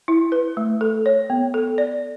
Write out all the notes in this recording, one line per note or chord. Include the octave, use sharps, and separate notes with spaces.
E4
B4
A3
A4
C#5
B3
A4
D5